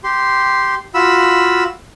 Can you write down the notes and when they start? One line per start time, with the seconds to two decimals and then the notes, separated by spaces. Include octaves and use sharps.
0.04 G4 C6
0.94 F4 F#4 B5 E6